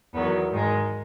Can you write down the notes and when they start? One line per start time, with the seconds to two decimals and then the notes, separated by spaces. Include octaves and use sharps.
0.13 E2 D#3 F#3 B3
0.51 G#2 D#3 G#3